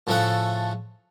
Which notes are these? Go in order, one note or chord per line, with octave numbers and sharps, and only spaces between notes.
A2 C#3 F3 A3 A4 F#5